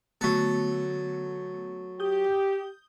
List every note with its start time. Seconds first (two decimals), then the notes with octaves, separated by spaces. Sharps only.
0.21 D3 F#3 A3 B3 A4
2.00 G4 D#6 G6 G7